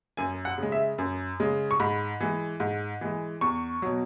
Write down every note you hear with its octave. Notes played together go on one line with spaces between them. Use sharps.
F#2 G#5
F#5
C#3 G#3
E5
F#2
C#3 G#3
C#6
G#2 B5
E3 G#3
G#2
E3 G#3
E2 C#6
B2 F#3